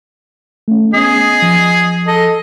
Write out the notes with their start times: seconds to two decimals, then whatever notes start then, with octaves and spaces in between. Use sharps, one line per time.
0.68 A3 C#4
0.94 B3 C#4 G#4 D#5
1.42 F3
2.07 A4 D#5